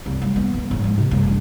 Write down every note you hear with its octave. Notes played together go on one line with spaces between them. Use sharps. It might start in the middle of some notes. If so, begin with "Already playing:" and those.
C2
G3
B3
E1
G#2
G#3
C3
G2
A1